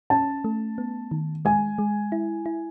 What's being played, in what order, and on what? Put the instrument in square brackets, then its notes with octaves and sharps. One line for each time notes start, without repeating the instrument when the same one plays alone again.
[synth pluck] C#4 [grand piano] A5
[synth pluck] A3
B3
D#3
[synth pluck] G#3 [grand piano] G#5
[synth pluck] G#3
E4
E4